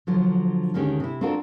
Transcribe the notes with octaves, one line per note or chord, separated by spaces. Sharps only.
D3 F3 F#3
D2 D3 D#3 G#3 C#4 G4
C3 E4
C4 D4 F4 F#4 A4 A#4